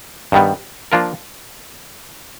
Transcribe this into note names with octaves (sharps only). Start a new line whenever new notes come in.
G2 D#3 G3 B3
F3 A#3 D4 F4 A#4